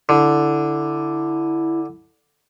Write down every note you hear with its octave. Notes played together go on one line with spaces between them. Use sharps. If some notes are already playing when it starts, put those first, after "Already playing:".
D3 E4